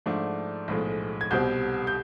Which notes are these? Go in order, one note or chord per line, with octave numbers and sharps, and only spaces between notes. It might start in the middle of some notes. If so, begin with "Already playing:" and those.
G#2 F3 A3 D4
B1 A2 F3 G#3
G#6
C2 B2 G3 C4 G6
G6